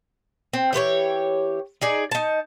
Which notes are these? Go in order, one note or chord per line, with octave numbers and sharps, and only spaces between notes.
C4
E3 G4 B4 C#5
D#4 G#4 D5
D#4 A5